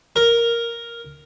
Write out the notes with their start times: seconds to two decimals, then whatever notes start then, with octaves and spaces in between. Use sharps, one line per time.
0.16 A#4